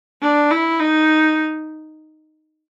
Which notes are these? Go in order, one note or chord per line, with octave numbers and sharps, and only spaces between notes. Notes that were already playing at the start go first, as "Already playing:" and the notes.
D4
E4
D#4